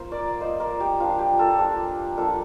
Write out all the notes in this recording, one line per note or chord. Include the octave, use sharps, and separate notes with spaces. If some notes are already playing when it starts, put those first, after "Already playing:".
Already playing: A#3 F4 C5
A#4 D5
A#3 F4 C5 D#5
A#4 D5
G4
F3 A#3 D4 F4
G4
F4 A4
F3 A#3 D4 G4
F3 A#3 D4 F4 A4